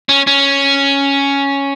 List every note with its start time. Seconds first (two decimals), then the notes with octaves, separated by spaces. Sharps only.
0.09 C#4
0.27 C#4